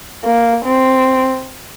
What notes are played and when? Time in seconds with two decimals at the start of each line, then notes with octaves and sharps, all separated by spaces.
0.25 A#3
0.65 C4